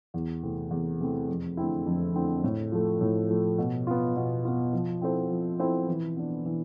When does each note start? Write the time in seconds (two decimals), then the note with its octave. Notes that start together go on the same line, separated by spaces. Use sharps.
0.14 E2
0.42 C3 E3 A3 C4
0.71 E2
1.00 C3 E3 A3 C4
1.29 F2
1.57 D3 A3 C4 E4
1.86 F2
2.15 D3 A3 C4 E4
2.44 A2
2.72 F3 A3
3.01 A2
3.30 F3 A3
3.58 B2
3.87 B3 F4
4.16 B2
4.45 B3 F4
4.73 F3
5.02 C4 E4 A4 C5
5.30 F3
5.60 C4 E4 A4 C5
5.88 E3
6.17 B3 D4
6.45 E3